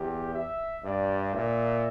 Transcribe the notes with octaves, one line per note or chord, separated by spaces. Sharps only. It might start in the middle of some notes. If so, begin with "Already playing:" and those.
Already playing: E2 G4
E5
G2 D5
A#2 E5